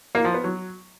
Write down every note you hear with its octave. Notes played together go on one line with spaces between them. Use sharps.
A#3
F3
B3
F#3